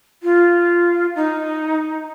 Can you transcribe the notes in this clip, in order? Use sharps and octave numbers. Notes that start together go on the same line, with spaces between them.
F4
D#4